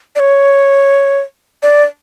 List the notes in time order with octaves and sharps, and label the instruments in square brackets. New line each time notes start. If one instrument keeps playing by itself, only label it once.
[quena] D5
C#5
D5